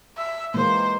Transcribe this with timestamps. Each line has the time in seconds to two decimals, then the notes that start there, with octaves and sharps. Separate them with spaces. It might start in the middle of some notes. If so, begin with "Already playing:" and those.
0.17 E5
0.54 E3 G#3 A#3 C5